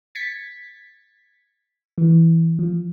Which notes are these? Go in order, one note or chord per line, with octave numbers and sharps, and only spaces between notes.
G#6 A6 B6 C#7
E3
F3